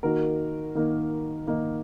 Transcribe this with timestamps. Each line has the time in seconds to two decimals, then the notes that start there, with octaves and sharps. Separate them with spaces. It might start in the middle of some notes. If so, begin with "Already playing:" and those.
0.03 D#3 A#3 D#4 F#4 A#4
0.75 D#3 A#3 D#4
1.47 D#3 A#3 D#4